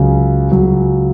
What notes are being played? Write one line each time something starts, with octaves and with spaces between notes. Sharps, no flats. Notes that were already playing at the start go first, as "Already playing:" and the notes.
Already playing: C#2 C#3 F#3
C#2 C#3 F#3